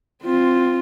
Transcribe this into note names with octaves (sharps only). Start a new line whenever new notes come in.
C4 F4